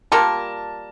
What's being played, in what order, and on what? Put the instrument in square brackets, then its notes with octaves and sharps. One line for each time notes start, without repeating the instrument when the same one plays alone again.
[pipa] G3 A#3 F4 A#4 [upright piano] A5